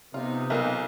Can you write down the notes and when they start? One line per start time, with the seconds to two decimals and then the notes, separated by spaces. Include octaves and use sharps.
0.14 C3 B3 D#4 F4
0.50 B1 A#3 F4